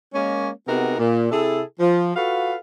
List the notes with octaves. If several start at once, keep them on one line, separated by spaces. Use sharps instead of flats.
G#3 A#3 C#4
C3 B3 D#4 F#4 G#4 A#4
A#2
C3 E4 G#4 A4
F3
F4 F#4 A4 B4 F5